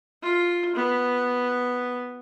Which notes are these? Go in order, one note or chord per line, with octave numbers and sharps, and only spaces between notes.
F4
B3